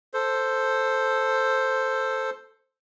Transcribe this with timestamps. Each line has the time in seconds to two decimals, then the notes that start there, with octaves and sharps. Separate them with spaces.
0.14 A4 C5